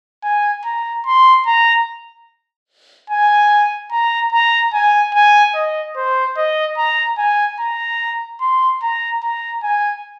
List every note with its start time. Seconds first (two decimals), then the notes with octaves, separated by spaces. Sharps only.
0.24 G#5
0.65 A#5
1.06 C6
1.46 A#5
3.10 G#5
3.92 A#5
4.32 A#5
4.73 G#5
5.14 G#5
5.55 D#5
5.96 C5
6.37 D#5
6.78 A#5
7.18 G#5
7.60 A#5
8.41 C6
8.82 A#5
9.23 A#5
9.63 G#5